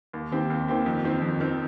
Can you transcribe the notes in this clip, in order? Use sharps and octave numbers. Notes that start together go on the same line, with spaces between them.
D#2
D#3 C4 G4
D#2
D#3 C4 G4
F2
D#3 C4
F2
D#3 C4